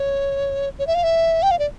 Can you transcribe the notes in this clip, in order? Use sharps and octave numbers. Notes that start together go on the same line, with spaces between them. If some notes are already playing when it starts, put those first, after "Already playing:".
Already playing: C#5
C#5
E5
F5
E5
G5
F5
D5